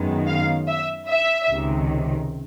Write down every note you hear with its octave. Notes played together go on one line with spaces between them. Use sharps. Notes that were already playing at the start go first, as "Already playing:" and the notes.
Already playing: F#2 D#3 G#3 B3
F5
E5
E5
C#2 C3 D#3